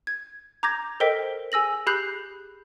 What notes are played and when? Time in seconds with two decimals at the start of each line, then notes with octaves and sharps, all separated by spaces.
0.07 G#6
0.63 A#5 D6 G6 G#6 A#6
1.00 A4 A#4 C5 D#5 G5 B6
1.52 G#4 G#5 E6 A#6 F#7
1.87 G4 G#4 B5 F#6 G6 C7